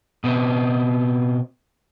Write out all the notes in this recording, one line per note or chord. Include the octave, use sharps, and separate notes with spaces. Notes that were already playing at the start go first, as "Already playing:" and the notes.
B2 B3 C4